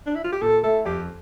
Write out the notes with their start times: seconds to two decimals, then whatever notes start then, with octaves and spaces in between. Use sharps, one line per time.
0.06 D4
0.15 E4
0.24 F4
0.32 G4
0.42 A#2 A4
0.63 A3 E4 A4
0.85 F2 G4